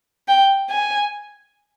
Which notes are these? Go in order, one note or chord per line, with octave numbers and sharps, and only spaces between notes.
G5
G#5